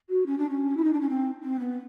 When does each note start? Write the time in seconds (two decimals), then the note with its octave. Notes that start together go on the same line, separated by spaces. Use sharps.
0.09 F#4
0.26 C#4
0.38 D4
0.49 C#4
0.77 E4
0.84 D#4
0.93 D4
1.00 C#4
1.09 C4
1.43 C4
1.59 B3